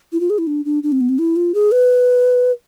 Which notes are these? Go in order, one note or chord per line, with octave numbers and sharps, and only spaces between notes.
E4
F4
G#4
E4
D4
D4
D4
C4
B3
C4
E4
F4
G#4
B4